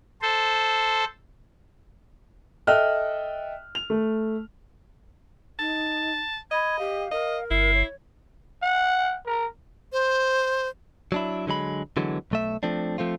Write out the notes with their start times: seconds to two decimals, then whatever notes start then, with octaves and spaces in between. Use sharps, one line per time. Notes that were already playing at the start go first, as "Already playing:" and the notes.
0.22 A4 C5
2.67 A4 D#5 E5 G5 F6 F#6
3.75 F7
3.90 A3
5.59 D#4 A5
6.51 D#5 B5 G#6
6.79 G4 F5
7.11 A#4 D#5
7.50 G1 E4 C7
7.73 C#5
8.62 F#5
9.26 A#4
9.93 C5
11.12 F#3 D4 E4
11.47 D3 F#3 G#3 B5
11.97 D3 E3 F#3 G#3 B3
12.31 B1 A3 E5
12.63 F3 A3 C4 D4
12.98 F3 A3 C4 F4